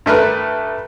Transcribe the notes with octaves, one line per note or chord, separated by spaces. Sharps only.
G2 A3 A#4 B4